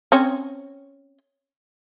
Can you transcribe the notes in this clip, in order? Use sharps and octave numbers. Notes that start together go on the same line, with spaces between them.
C4 C#4 C#5